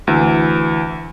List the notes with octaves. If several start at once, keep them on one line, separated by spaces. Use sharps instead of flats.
D2 E3